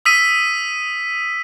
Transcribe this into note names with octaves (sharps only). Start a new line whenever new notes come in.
D#6 E6 B6 D#7